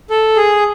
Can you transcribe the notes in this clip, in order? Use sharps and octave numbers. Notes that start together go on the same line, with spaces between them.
A4
G#4